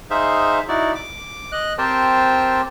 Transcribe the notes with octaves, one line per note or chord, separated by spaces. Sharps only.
D#4 G#4 C5 E5 F5
D#4 E4 F#4 D5
D6
D#5 F#6
C4 G4 A#4 C5 G5 A5